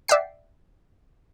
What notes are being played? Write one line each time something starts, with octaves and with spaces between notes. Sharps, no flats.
D5 E5 F#5 G5 C7